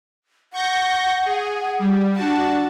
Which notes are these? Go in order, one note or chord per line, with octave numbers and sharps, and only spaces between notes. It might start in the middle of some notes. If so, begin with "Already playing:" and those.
F#5 C#6 G6 A#6
G#4
G3
D4 F#4 F#5 A5